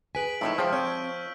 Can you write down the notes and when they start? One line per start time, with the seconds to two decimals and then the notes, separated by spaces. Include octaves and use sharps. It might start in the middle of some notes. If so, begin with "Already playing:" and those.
0.15 G#4 B4 G#5 B6 D7 F#7
0.41 A2 F3 D#4 E4 C#6 E6
0.58 F3 G#3 G#4 C5 C#5 G5
0.73 C4 C#5 F6 G6 D7